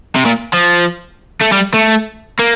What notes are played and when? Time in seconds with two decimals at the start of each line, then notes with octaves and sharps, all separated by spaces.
0.15 C3
0.25 A#2
0.53 F3
1.41 A3
1.52 G3
1.74 A3
2.39 A#3